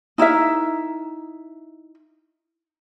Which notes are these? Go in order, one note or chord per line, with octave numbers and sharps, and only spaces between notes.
D#4 E4 A#4 E5